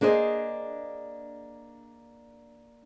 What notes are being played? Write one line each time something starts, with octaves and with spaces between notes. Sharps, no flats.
A#3 D4 G#4 C5 D#5